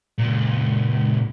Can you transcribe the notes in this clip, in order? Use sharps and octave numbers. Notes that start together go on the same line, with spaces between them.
C#2 A#2